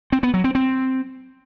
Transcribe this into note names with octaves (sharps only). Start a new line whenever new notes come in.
C4
B3
F#3
C4
C4